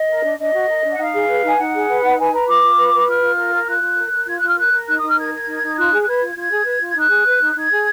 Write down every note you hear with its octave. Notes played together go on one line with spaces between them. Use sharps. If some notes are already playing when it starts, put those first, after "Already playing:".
Already playing: D#5
A#4
D4
D4 D#5
F#4
A#4
D4
F#5
D#4 F5
G#4
B4
D#4 G#5
D#4 F#5
G#4
B4
D#4
B4 G#5
B4 A#5
F4 D6
F4
B4
B4
F4 F6
F4
A#4
A#4
F4 F#6
F4
A#4
A#4
F4 G#6
F4 F#6
F6
A#4 F#6
A#4
D#4 F#6
D#6
D#4 F6
A#4 G#6
A#4
D#4
D#4
F4 F#6
G#4
F#6
B4 G#6
F4
F4 G#6
G#4
B4
F4
D#4 F#6
G#4
B4
D#4
D#4 G#6
G#4